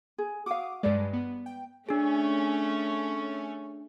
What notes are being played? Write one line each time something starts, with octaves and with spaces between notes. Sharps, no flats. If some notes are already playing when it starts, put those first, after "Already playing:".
G#4
F#4 F5 D6 D#6
G2 G3 G#3 B4 D5
B3
G5
A3 C#4 D4 G#4